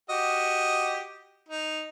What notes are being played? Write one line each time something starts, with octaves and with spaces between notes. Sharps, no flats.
F#4 G4 D#5
D#4